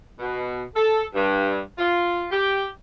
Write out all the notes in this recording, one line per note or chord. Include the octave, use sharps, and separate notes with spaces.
B2
A4
G2
F4
G4